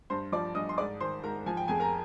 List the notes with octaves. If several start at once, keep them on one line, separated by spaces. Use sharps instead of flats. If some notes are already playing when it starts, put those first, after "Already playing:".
G2 C5 C6
F3 D5 D6
G2 D#5 D#6
C6
G#2 D5 D6
D#3 C5 C6
G#2 A#4 A#5
F3 G#5
G5
F2 G#4 G#5
A#4 A#5